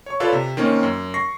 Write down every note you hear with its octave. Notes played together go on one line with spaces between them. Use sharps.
C#5 C#6
F4 A4 B4 C#5 D5 F5
C3
D#3 A#3 C4 C#4
F#2
C#6 A#6 C7